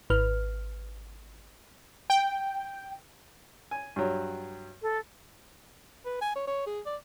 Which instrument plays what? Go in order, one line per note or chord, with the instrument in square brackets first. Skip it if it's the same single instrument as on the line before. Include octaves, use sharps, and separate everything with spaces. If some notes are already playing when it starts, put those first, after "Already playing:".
[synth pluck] G#1 B4 F6
[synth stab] G5
[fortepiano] G#5
G2 F#3
[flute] A4
[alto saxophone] B4
G#5
C#5
C#5
G#4
D5